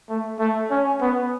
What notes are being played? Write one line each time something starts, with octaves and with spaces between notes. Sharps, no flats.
A3
A3
C#4
B3